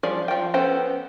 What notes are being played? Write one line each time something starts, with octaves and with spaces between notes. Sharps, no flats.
F3 G3 G#4 D5
F3 G5
B3 C#4 A4 C5 G5